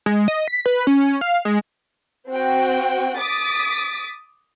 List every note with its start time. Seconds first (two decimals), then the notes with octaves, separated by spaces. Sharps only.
0.06 G#3
0.28 D#5
0.48 B6
0.66 B4
0.87 C#4
1.21 F5
1.45 G#3
2.30 C4 F#4 G5
3.18 D6 D#6 A6 B6